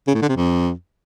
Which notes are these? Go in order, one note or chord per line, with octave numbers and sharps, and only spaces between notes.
C#3
A2
D3
C3
F2